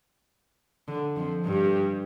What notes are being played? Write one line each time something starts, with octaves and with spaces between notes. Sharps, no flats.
D3
F2 F3
G2 G3